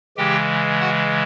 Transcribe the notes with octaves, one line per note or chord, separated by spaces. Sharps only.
C#3 E3 G#3 G4 G5
F#4 F#5